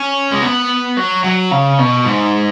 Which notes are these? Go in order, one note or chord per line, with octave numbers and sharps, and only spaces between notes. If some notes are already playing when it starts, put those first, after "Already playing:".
Already playing: C#4
G#3
B3
F#3
F#3
C#3
B2
G#2